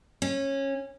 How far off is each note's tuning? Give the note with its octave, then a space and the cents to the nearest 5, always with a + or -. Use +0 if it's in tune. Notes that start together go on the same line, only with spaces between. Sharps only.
C#4 -20